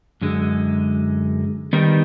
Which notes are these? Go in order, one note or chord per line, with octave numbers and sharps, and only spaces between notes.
F#2 D3 G#3
D#3 G3 B3 D#4